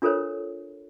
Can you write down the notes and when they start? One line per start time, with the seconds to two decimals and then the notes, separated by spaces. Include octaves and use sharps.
0.02 D4 F4 A4 A#4 C5 C#5